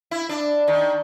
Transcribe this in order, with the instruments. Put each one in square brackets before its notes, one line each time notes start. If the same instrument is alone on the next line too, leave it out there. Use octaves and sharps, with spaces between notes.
[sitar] E4
D4
D#3